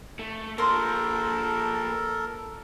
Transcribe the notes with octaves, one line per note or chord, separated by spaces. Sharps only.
A3
F3 A#3 A4 A#4 C5 C6